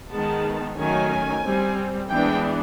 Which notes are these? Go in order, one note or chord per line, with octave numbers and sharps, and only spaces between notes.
D#3 G#3 B3 A5
D#3 F#3 A3 C#4 G#5
G3 C4
E3 G#3 B3 D4 G5